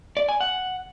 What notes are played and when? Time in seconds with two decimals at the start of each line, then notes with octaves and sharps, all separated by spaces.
0.17 D5
0.29 G#5
0.41 F#5